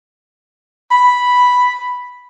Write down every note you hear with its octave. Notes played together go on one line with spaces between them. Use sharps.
B5